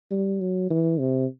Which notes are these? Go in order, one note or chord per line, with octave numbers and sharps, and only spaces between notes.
G3
F#3
E3
C3